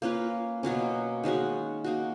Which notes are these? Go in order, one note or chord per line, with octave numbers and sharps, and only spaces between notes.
A#3 C#4 F4 B4
B2 F#3 A#3 C#4
D#3 G#3 C#4 F#4
A#3 D#4 F#4